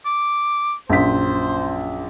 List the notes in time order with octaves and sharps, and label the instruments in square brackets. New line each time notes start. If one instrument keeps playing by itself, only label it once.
[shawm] D6
[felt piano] A#1 F#2 B6 [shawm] C5